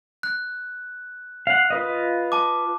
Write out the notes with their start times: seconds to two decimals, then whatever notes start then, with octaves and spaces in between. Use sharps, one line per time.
0.23 F#6
1.47 F5 F#5
1.70 F4 B4 D#5
2.32 A5 D6